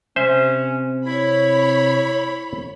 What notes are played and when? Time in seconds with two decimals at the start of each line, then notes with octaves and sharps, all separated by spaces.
0.16 C3 C#4 C5 E5
1.05 E4 C#5 B5